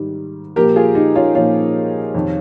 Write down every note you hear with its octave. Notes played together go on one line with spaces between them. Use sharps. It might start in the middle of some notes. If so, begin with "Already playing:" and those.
Already playing: G#2 D#3 G3
A#2 F3 A#3 G4 A#4
F4 G#4
D#4 G4
C#4 F4
A#2 F3 A#3 C#4 F4
F2 C3 D#3